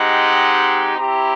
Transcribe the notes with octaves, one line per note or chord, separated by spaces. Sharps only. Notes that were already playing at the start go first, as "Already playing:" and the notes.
Already playing: G#3 C4 D#4 G4 F#5
C4 E4 G4 A#5